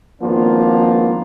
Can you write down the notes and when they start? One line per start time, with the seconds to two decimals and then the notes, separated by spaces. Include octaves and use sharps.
0.22 G#1 F3 A#3 B3 D4 F4